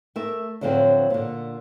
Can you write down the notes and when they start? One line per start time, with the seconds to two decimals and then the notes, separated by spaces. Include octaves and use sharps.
0.16 A3 A#4 E5
0.61 D2 A2 D3 F3 F#3 C4
1.10 A#2 D3